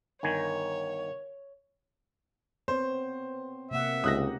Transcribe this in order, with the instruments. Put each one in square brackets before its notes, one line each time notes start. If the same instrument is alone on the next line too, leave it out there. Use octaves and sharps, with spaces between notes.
[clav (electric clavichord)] G1 D#3 G#5 [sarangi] C#5
[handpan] B3 C4 C#5 [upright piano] C5
[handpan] C3 A#3 F#5 [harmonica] E5
[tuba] C#2 [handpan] C#3 D#4 G4 [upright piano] D#6 F#6 A#6